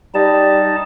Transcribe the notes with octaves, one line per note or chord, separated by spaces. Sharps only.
G3 D#4 A5